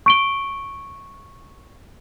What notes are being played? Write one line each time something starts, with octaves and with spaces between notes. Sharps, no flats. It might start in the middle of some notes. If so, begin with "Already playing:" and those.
C#6 D7 G7